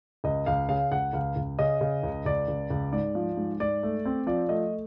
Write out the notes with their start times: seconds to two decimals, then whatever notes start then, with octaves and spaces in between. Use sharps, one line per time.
0.24 C#2 D#5
0.46 C#2 F5
0.69 C#3 F5
0.92 C#2 F#5
1.13 C#2 F5
1.36 C#2
1.59 C#3 D#5
1.81 C#3
2.03 C#2
2.26 C#2 D5
2.48 C#2
2.70 C#2
2.92 G#2 D5
3.15 F3
3.37 G#2
3.60 G#2 D5
3.83 A3
4.05 C4
4.27 F3 D5
4.49 A3 D#5